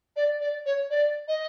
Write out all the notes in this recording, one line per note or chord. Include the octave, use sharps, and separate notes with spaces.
D5
D5
C#5
D5
D#5